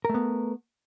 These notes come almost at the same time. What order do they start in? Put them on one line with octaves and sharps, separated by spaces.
A#4 A3 B3